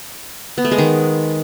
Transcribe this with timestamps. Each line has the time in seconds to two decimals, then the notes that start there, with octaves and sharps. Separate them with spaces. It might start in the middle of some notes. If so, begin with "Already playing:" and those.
0.58 B3
0.65 A3
0.71 G#3
0.78 D#3